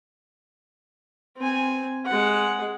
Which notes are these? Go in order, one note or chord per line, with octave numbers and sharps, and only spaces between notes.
C4 G#5
G#3 F#5